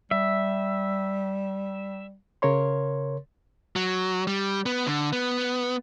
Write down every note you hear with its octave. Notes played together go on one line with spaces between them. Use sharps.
G3 E5
C#3 A#4 C#5 C6
F#3
G3
B3
D3
B3